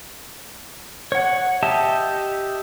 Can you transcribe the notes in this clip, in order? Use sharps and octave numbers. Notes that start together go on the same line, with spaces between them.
C#5 F#5
G4 D#5 E5 A5